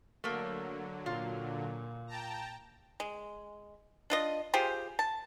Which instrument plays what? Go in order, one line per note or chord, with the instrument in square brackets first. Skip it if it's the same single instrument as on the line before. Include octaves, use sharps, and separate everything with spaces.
[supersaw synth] D3 F#3 [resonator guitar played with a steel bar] A3 A#3
[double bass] A#2 [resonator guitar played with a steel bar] F4
[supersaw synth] G5 A5 A#5
[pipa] G#3
D4 F4 D#5
F4 G4 G#4 C5
A5